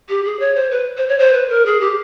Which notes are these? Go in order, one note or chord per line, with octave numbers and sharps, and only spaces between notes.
G4
G#4
C#5
C5
B4
C5
C#5
C5
B4
A#4
G#4
G4